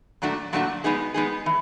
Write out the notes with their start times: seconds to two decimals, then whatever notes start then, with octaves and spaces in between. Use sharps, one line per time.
0.22 A#2 F#3 A3 D4 F#4
0.53 A#2 F#3 A3 D4 F#4
0.84 G#3 B3 D#4 G#4
1.14 G#3 B3 D#4 G#4
1.46 E3